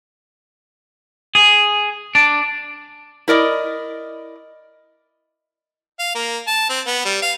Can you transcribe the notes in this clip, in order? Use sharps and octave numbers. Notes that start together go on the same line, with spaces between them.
G#4
D4
E4 A#4 D5 D#5
F5
A#3
A5
C4
B3
G3
F5